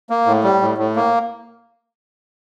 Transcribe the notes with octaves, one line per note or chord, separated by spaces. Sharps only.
A#3
A2
G3
A2
A2
A#3